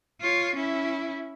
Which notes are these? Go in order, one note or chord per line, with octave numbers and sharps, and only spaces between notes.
F4 C#5
C#4 E4